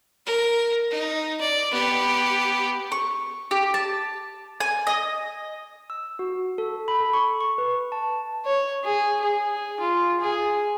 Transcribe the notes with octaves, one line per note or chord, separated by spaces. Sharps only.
A#4
D#4
D5
B3 G4
C#6
G4
A5
G#5
D#5
E6
F#4
A4
B5
A4
C#6
C#6
B4
A5
C#5
G#4
G#4
F4
G#4